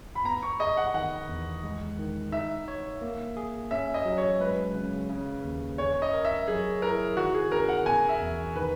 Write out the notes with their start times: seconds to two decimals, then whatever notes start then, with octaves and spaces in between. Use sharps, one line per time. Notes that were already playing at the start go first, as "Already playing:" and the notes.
0.15 B5
0.25 B3 A#5
0.43 C#6
0.60 G#4 D#5
0.77 F#5
0.94 D#3 F#5
1.28 E2
1.64 G#3
1.99 D#3
2.32 D#4 E5
2.68 C#5
3.01 A#3
3.37 G#4
3.71 C#4 E5
3.94 D#5
4.05 F#3
4.17 C#5
4.40 G#3 B4
4.75 C#3
5.09 C#3
5.44 D#2
5.78 C#4 C#5
6.02 D#5
6.13 A#4
6.25 E5
6.48 F#3 G#4
6.82 E4 A#4
7.17 D#3 F#4
7.34 G#4
7.52 C#4 A#4
7.69 F#5
7.86 B2 G#5
8.09 E5
8.21 E2
8.55 D#3 B4